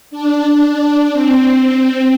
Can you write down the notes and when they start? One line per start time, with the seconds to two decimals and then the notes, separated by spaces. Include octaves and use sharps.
0.11 D4
1.12 C4